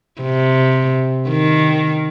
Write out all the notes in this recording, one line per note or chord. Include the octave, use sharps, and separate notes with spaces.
C3
D#3